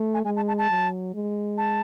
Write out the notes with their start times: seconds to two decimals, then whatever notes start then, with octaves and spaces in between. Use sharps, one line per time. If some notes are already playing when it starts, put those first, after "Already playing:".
Already playing: A3
0.14 G#5
0.25 G#3 G#5
0.36 A5
0.48 A5
0.58 A5
0.70 F#3
1.14 G#3
1.57 A5